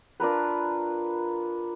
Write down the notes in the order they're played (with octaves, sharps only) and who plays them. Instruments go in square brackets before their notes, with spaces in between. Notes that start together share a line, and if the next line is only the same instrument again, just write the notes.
[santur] D4 F4 A#4 B4